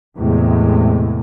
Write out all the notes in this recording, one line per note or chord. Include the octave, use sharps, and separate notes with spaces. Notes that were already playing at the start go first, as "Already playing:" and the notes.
E2 A2 C3 G#3